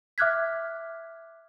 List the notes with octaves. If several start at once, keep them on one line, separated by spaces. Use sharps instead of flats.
E5 D6 F6 F#6 G#6 B6